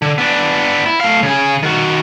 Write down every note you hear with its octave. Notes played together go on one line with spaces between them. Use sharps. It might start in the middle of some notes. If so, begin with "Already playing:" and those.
D3
B3 D4
E4
A3 F5
C#3 G#4
D#3 F#4